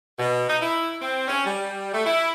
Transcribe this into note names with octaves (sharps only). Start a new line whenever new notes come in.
B2
D#4
E4
C4
C#4
G3
A3
E4